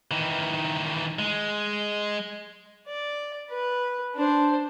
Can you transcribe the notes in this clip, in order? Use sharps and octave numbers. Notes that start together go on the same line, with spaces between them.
D#3 E3
G#3
D5
B4
D4 C5